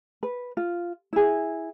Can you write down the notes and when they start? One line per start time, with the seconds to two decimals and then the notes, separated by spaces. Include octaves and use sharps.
0.23 B4
0.57 F4
1.13 E4 G#4